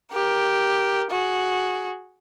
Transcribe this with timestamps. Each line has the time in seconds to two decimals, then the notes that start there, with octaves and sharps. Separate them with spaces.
0.12 G4 A#4
1.11 F#4 G#4